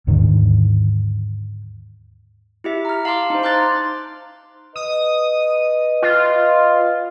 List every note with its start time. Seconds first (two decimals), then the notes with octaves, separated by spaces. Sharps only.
0.07 D#2 G#2 D3 D#3
2.64 E4 G4 E5
2.85 A#5 F6
3.05 F5 A5 C6 D6
3.30 D#4 C5
3.43 A#5 C6 D6 F6 F#6 A6
4.76 B4 D#5 D#6
6.02 F4